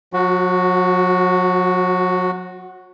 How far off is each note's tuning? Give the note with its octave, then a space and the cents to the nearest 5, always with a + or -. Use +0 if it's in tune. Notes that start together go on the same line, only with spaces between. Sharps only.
F#3 -40 F#4 +0